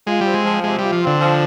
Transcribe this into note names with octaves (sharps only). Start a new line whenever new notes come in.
G#3 F4
G3 C4
G#3
F3
C3 G#3
G3 F4
F3
D3 C4
F3